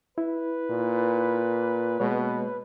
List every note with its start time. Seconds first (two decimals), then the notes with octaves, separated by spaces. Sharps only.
0.18 E4 B4
0.70 A#2
2.00 B2 G#3 A#3 C#5